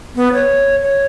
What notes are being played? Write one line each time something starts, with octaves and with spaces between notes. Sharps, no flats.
B3
C#5
C#5